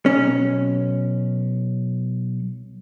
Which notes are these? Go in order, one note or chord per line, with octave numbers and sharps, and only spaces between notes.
B1 C#4